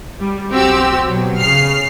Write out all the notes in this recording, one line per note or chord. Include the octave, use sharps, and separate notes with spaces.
G3
B1 C4 F#4 G4 E6
B2 F#3
C#3 F6 C7